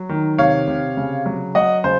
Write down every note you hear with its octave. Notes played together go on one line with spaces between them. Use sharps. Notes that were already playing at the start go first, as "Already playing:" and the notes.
Already playing: F#3
D#3
C3 C#5 F5
C3
C#3
F#3
F#3 D#5 F#5
C#3 C5